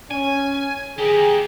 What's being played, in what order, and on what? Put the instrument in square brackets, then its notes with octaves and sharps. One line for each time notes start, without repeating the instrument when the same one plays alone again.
[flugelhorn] C#4 [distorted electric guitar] G#5
[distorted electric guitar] G4 A#4 [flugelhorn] G#4